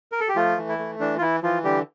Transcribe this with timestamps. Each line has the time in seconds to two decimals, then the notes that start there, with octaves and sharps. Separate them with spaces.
0.12 A#4
0.20 A4
0.29 G4
0.36 F3 A3 F4
0.58 E3
0.69 E4
0.79 A3
1.00 E3 D4
1.18 F4
1.21 E3 E4
1.42 E3 F3 F4
1.64 D3 G3 G4